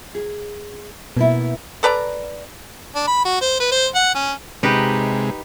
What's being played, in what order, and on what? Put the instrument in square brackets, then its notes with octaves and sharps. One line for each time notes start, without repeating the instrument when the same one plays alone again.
[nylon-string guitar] G#4
[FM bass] B2 [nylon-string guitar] A#3 B3 E4
[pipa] A4 B4 D5 A#5
[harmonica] D4
B5
F#4
C5
B4
C5
F#5
C#4
[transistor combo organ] C3 G#3 [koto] D#4 G4 B4